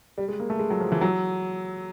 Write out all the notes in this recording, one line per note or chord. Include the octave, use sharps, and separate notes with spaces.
G3
G#3
A#3
A3
G#3
F#3
F3
E3
F#3